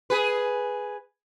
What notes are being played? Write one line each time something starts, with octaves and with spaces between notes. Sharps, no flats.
G#4 B4